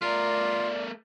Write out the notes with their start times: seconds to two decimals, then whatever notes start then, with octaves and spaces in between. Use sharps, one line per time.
0.02 A3 F4 A#4 D5